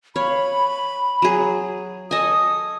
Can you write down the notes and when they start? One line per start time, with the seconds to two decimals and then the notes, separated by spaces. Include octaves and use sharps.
0.16 C#5 F5 B5
1.22 F#3 G#4
2.11 A4 D#5 G#5 D#6